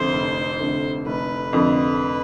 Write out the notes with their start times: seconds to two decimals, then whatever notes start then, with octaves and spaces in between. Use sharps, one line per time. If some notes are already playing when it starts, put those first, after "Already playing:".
Already playing: F1 F2 D3 A3 C5
0.13 F1
0.60 F2 D3 A3
1.06 F1 B4
1.53 F2 D3 A3